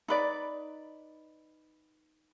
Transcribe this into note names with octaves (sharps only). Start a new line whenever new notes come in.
D#4 B4 D5